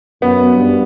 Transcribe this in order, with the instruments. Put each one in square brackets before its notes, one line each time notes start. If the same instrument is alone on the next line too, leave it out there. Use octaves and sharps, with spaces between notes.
[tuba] F#2 [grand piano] B3
[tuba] G2